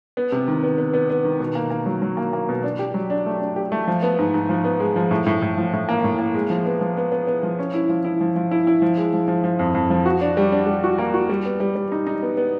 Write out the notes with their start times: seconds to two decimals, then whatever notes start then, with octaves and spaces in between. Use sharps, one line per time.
0.17 B3
0.32 C3
0.48 D#3
0.63 B3
0.78 B3
0.94 B3
1.10 B3
1.25 D#3
1.40 B2
1.55 A#3
1.70 A#3
1.86 F#3
2.02 F#3
2.17 A#3
2.33 A#3
2.49 B2
2.63 D4
2.79 G4
2.94 F#3
3.10 D4
3.26 A3
3.41 D4
3.56 G4
3.72 A3
3.88 F3
4.02 B3
4.19 G#2
4.34 G#2
4.49 F3
4.64 B3
4.80 G#3
4.96 F3
5.11 A2
5.26 A2
5.42 A2
5.57 F3
5.73 A2
5.89 A#3
6.04 A2
6.19 A#3
6.34 G#3
6.50 F3
6.66 B3
6.81 F3
6.97 B3
7.12 B3
7.27 B3
7.43 F3
7.59 C#4
7.74 E4
7.89 F3
8.05 E4
8.21 F3
8.36 F3
8.51 E4
8.67 E4
8.82 F3
8.97 G#3
9.14 F3
9.28 F3
9.44 F3
9.59 F2
9.75 F2
9.90 F3
10.06 F#4
10.21 D4
10.37 G3
10.52 D4
10.67 G3
10.84 F#4
10.98 A#3
11.14 F#4
11.29 G3
11.45 B3
11.60 G3
11.76 G3
11.92 D#4
12.07 D#4
12.23 B3
12.37 B3